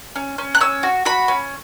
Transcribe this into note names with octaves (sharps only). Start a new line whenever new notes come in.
C#4
C#4
F#6
C#4 E6
F#4
F#4 B5
C#4